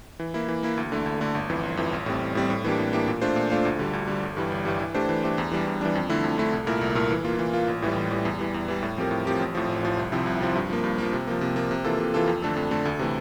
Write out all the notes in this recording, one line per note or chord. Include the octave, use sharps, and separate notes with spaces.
E3
A#3 E4
E3
A#3 E4
D2
D3 A3
D2
D3 A3
G1
F2 E3
G1
F2 E3
A1
A2 G3 C4
A1
A2 G3 C4
A2
E3 A#3 D4 G4
A2
E3 A#3 D4 G4
A#2
A3 D4 F4 C5
A#2
A3 D4 F4 C5
D2
D3 G3
D2
D3 G3
G1
G2 E3 G3
G1
G2 E3 G3
E3
A3 D4 G4 C5
E3
A3 D4 G4 C5
E2
E3 G3 D4
E2
E3 G3 D4
F2
D3 A3 E4
F2
D3 A3 E4
C2
A#2 A3 E4 A#4
C2
A#2 A3 E4 A#4
E3
A#3 F4
E3
A#3 F4
A1
A2 E3 G3
A1
A2 E3 G3
E2
E3 G3
E2
E3 G3
A2
F3 C4 G4 A#4
A2
F3 C4 G4 A#4
A1
A2 F3
A1
A2 F3
C2
C3 F3 C4 E4
C2
C3 F3 C4 E4
G2
F3 A#3
G2
F3 A#3
C3
F3 A#3
C3
F3 A#3
C3
E3 A#3 F4 A4
C3
E3 A#3 F4 A4
F2
D3 A3 D4 A4
F2
D3 A3 D4 A4
D2
C3 E3 A3